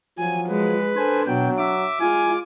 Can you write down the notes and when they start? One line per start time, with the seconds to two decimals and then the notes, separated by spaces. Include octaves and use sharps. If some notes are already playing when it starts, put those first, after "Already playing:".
0.19 F3 F#3 G#5
0.49 G#3 B4
0.97 D4 A4 C5 G#5
1.27 B2 F#3 G5
1.58 E5 D6
2.00 G#3 F4 G#5